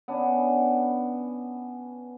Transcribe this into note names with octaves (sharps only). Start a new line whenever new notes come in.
B3 C#4 D4